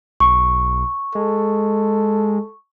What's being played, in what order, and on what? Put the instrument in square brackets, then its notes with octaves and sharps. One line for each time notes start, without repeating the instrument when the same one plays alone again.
[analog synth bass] B1 [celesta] C#6
[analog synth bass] G#3 [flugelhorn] A4